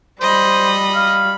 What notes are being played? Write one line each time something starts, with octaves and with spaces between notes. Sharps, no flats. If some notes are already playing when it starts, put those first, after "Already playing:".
G3 C5 D#5 B5
F5